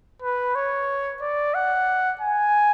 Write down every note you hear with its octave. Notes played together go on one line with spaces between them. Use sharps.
B4
C#5
D5
F#5
G#5